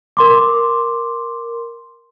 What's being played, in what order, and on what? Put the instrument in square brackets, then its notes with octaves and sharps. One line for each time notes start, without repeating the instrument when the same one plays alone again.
[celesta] A#4 C6 D6